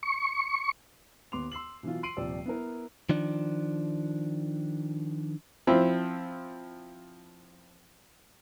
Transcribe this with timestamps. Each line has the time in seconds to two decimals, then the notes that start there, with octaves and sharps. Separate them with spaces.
0.03 C#6
1.32 D#2 B3 C6 D6 F7
1.52 C6 E6 C7 F#7
1.83 B2 E3 F#3 F4
2.03 C6 C7 D7 D#7 F#7
2.17 D#1 C3 F3 G4 D5 E6
2.46 B3 E4 A#4
3.10 D#3 F3 D4
5.67 F3 C4 E4